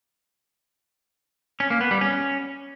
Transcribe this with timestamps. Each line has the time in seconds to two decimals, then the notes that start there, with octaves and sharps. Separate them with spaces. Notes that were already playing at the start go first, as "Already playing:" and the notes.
1.60 C#4
1.70 A#3
1.81 B3
1.91 G3
2.01 C#4